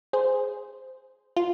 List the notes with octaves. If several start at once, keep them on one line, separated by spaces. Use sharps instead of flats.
G#4 C5
F4